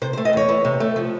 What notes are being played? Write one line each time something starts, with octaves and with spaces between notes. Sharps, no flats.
C3 C5
C5
A3
D#5
E2 C#5
E3
C3
A3
F3